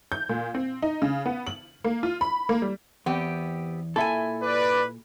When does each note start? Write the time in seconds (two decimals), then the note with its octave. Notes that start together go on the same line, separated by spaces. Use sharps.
0.12 G6
0.29 A#2
0.55 C4
0.82 D#4
1.02 C#3
1.26 B3
1.47 F#7
1.84 A#3
2.03 F4
2.21 B5
2.49 A#3
2.62 G3
3.06 E2 B3 C4 G4
3.96 A#2 E4 A4 E5 G#5
4.43 B4 D5